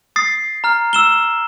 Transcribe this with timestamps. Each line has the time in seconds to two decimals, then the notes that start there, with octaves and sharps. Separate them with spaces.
0.16 D#6 A6 C7
0.64 A#5 F6
0.93 E6 E7 G7